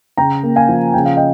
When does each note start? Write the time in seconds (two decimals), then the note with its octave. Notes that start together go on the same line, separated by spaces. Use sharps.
0.17 C#3 G5 A#5
0.43 A#3
0.56 F5 G#5
0.69 F3
0.94 C#3 G5
1.05 F5
1.17 D#5 G5